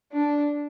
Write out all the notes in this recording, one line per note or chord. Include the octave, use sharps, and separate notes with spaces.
D4